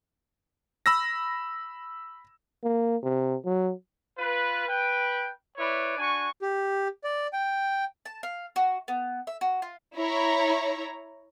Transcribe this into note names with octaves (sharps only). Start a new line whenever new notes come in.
B5 E6 A#6
A#3
C3
F#3
F4 B4
B4 G5
E4 B4 C#5 D5
D4 F#4 G#5 C#6
G4
D5
G5
A5
F5
F#4
B3
E5
F#4
F4
E4 C#5 A#5